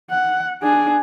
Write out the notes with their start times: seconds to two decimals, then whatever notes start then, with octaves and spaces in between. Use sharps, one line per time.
0.10 F#5
0.62 D4 G#4